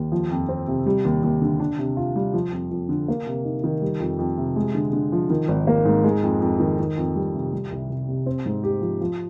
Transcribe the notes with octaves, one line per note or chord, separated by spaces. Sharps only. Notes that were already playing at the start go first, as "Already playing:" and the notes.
Already playing: D#2
F3
F2
C4
C3
G3
D#2
D#2
D3
D4
C3
F4
G3
F3
F2
F2
D3
A#3
C3
D#4
D#3
G3
F2
F2
C3
G#3
D3
D3
F3
D#3
G#1
A#3
G#2
G#3
F2
F2
D#3
D#3
F2
G3
C3
G3
C2
C2
C3
C4
G#2
G4
F3
F3